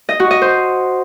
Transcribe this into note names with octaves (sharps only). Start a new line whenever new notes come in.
D#5
F#4
D#5
C5